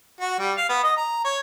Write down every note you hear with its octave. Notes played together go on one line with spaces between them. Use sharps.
F#4
G3
F5
B3
D#5
A#5
C#5